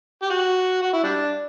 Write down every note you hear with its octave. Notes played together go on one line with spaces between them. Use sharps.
G4
F#4
F#4
E4
G3 D4